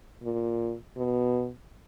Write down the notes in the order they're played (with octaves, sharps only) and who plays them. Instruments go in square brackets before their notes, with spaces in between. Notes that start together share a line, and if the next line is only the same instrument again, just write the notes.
[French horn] A#2
B2